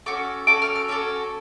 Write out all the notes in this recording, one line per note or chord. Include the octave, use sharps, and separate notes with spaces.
C#4 F#4 A4 D6
C#4 F#4 A4 D6
F6
F6
C#4 F#4 A4 D6